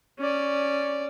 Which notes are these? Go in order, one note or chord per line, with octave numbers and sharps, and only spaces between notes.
C#4 D5